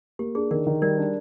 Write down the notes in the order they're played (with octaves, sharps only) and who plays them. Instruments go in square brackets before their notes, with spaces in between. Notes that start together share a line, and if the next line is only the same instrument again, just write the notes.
[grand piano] A#3 [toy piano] G4
[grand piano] D4 [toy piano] G#4
[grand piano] D#3 [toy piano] A#4
[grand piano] D#3
[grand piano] G3 [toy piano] A#4 D5
[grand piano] D4